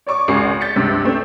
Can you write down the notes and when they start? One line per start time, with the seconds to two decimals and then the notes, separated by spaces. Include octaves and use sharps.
0.06 C#5 D5 C#6 D6
0.28 G#1 C#2 C#3 G#5 C7 C#7
0.61 G6 A6 B6 C#7
0.76 C#2 G2 C3
1.04 A3 C4 D4